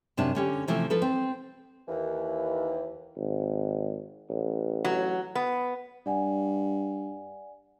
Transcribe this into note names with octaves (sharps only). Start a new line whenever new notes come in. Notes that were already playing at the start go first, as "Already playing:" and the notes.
F#2 C3 D4 A5
D3 C#4 G4
C3 E3 F3 A3
F3 A4 B4
C4
D#2 E3
G#1
A1
F#3
B3
G2 D5 F#5 G#5